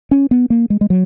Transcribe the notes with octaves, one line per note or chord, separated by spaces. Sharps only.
C#4
B3
A#3
G#3
G#3
F#3